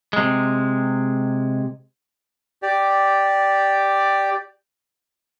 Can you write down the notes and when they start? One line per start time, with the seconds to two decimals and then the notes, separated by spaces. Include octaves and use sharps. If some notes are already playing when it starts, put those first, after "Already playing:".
0.13 C3 G#3
2.62 G4 D5